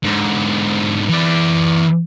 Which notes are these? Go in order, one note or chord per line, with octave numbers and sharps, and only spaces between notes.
G#2 D3
E3 D5